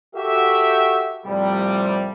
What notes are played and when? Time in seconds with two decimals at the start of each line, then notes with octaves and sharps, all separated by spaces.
0.16 F#4 G4 A4 E5
1.26 C2 A2 C3 F3 G3